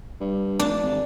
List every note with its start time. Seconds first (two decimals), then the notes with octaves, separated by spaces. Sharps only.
0.20 G2
0.59 F1 D4
0.82 G#1